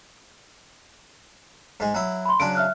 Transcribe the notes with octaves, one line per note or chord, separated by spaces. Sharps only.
G#2 G#3
F#3 E4
B5 C6
C#3 F#3 D4 D7
E5 F6 F#6